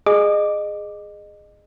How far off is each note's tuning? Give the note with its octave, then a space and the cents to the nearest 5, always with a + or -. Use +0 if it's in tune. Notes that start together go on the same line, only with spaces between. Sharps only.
G#4 +0 D#5 -25 D6 +0